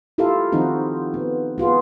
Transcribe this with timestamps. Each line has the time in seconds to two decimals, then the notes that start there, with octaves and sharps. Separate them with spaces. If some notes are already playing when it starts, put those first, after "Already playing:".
0.18 E4 F4 G4 A4 A#4 F5
0.52 D#3 F3 C4 D#4 F#4
1.14 B3
1.58 B3 F4 F#4 G#4